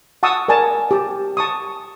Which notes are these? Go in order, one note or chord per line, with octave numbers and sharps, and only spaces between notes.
F#5 A5 C#6 D#6 E6
A#4 D5 G#5 A5
G4 A5
A5 C#6 D#6